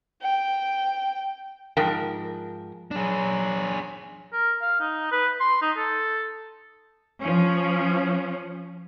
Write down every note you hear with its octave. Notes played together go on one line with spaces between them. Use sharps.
G5
G#2 F3 A#4 G5
F#3 D4 G#4
A#4
F5
D#4
B4
C6
D#4
A4
F3 C#4